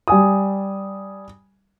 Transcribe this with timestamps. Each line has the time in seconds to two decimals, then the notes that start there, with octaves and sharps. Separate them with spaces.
0.08 G3 G#5 D#6